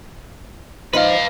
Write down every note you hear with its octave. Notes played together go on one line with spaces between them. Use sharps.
F3 D#4 B4 F5